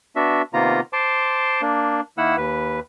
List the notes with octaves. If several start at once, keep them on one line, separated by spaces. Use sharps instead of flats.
B3 D4 F#4 E5
C3 D#3 A#3 B3 F4 A#5
C5 A5 C6 D6
A#3 D4
D#3 A#3 E4 F#5 E6
D#2 B4